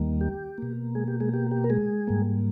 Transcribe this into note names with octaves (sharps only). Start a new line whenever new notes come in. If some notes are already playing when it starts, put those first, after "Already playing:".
Already playing: D#2 D#3 G3 A#3
G4
B2 A#3
G#3 G#4
G4
G#3 G#4
G4
G4
A#4
G#3 G#4
G#2 G3 A#3